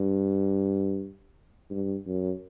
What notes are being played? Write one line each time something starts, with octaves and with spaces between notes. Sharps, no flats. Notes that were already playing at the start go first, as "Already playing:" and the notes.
Already playing: G2
G2
F#2